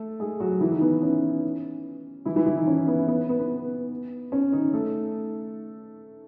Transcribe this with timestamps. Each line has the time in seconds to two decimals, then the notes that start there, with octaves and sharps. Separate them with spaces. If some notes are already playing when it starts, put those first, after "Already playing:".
Already playing: A3 A4
0.20 G#3 G#4
0.40 F#3 F#4
0.60 E3 E4
0.71 D#3 D#4
0.81 B3
1.02 C#4
2.25 E3 E4
2.36 E3 E4
2.46 E3 E4
2.56 D#3 D#4
2.67 C#4
2.88 B3
3.08 B3
3.29 B3
3.39 B3
4.32 C#4
4.52 D#3 D#4
4.73 A3 A4